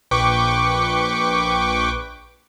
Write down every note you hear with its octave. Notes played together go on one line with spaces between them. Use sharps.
A#1 B4 G5 C#6 D6